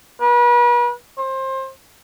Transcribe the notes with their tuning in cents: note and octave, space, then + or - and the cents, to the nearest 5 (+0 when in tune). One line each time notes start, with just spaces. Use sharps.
B4 -40
C5 +25